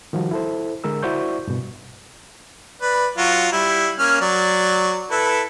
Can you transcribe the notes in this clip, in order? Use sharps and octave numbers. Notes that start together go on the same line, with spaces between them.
D#3 F3 G3 F#4
E4 A4 C5
D3 G#3 A#4 E6
E4 F#4 C5 D5 C#6 G6
G2 B2
B4 D5
F#3 F4 F#4
G3 E4
A#3 C#4 F6
F#3 D5
E4 A4 B4